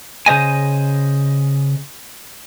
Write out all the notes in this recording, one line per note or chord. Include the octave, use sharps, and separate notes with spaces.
C#3 C5 D#5 G#5